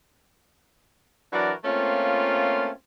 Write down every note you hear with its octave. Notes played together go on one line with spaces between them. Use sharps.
E3 F#3 D4 F#4 A#4 D5
A3 A#3 C4 C#4 F4